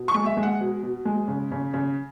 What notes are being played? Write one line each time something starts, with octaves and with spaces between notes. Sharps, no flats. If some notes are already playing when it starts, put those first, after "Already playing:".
Already playing: B2
C#6
G#3
E5
G#3
F#5
B2
B2
G#3
C#3
C#3
C#3